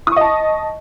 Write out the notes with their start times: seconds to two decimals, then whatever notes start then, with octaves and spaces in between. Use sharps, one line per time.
0.07 D#6
0.12 C#6
0.16 D#5
0.21 A5